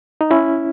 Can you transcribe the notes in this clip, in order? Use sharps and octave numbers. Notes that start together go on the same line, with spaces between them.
D#4
C#4 E4